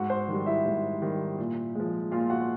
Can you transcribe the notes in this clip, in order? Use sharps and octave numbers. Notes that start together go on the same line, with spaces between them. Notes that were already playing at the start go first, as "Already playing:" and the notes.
Already playing: G#2 F#4 F#5
C5 C6
D#3 G3
E4 E5
G#2
D#3 G3
A#2
F3 G#3
A#2 F4 F5
F#4 F#5